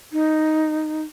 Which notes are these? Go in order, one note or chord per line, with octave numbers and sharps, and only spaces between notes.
D#4